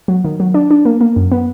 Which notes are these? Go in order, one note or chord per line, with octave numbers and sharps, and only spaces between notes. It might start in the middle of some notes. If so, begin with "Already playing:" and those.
F#3
D#3
F#3
D4
D4
A#3
A#3
F#2
B3